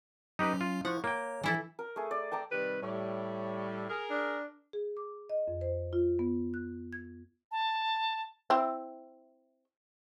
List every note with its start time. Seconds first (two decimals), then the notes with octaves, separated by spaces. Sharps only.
0.39 F#3 C#4 D#4 G4 B4
0.61 F4
0.85 F3 E4 F#5 C#6
1.04 A#3 C#5 G5
1.44 E3 F3 E4 A4
1.79 A#4
1.96 A3 G#4
2.11 D5
2.32 G5 A5 A#5 D6
2.52 C3 D#3 G3 B4
2.83 A2 G3 C#5
3.90 G#4 A#4
4.10 D4
4.73 G#4
4.97 D6
5.30 D#5
5.48 F2
5.61 C5
5.93 F4
6.19 B3
6.54 F#6
6.93 G#6
7.52 A5
8.50 C4 E4